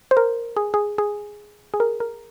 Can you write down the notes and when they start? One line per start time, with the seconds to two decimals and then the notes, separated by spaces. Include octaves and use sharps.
0.11 C5
0.17 A#4
0.56 G#4
0.74 G#4
0.98 G#4
1.74 G#4
1.80 A#4
2.00 A#4